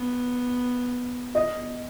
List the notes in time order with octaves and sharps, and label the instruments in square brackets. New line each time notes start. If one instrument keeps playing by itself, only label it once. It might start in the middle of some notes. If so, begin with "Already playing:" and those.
Already playing: [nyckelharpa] B3
[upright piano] D#5